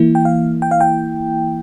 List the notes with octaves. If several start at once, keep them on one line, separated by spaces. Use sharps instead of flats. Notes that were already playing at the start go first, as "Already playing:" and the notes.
Already playing: E3 A#3 E4
G5
F5
G5
F5
G5